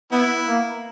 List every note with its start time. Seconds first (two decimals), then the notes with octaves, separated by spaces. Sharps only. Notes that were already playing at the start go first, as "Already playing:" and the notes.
0.12 B3 E4
0.48 A#3